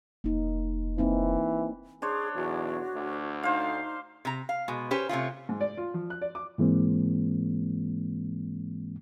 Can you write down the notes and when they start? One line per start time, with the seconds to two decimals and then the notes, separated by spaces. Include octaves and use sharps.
0.24 F1 A#3 D#4
0.98 E3 A#3 C4 D#4
2.02 D4 G#4 C5 C#5
2.36 B1 E2 F#4
2.95 D2
3.43 D#4 C5 F5
4.25 C3 A#5
4.49 F5
4.68 B2 G#3
4.91 C#4 G4 B4 C5
5.09 C3 A3 C#4 F4
5.49 G#2
5.61 D5
5.77 F4
5.94 F3
6.10 F#6
6.22 D5
6.35 D6
6.58 G#2 E3 G#3 A#3 C4